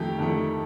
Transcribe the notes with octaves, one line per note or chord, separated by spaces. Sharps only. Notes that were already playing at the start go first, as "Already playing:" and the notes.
Already playing: F2 D#3 A3 G4
F2 D#3 A3